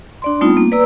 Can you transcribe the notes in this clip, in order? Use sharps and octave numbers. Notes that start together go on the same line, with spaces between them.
D4 D5 C6
G3 A3 B3 C4 D#4 F4
A#3
B4 D5 A#5 E6